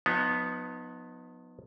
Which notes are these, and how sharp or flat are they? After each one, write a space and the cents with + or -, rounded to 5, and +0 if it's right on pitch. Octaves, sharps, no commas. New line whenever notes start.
F3 +40 B3 +0 D#4 +0